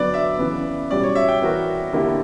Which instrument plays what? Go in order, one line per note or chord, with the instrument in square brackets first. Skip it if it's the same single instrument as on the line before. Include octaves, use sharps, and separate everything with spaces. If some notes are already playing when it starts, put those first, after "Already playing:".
Already playing: [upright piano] D3 F#3 B3 [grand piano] D5
[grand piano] E5
[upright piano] C#3 E3 B3
[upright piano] B2 G3 C#4 [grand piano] D5
[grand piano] C#5
E5
G5
[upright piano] E3 B3 F#4 A#4
D3 A#3 E4 G4